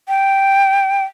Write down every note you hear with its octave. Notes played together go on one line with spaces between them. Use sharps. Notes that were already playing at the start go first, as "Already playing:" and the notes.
G5